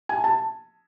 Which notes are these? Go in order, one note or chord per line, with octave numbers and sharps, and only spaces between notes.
G#5
A5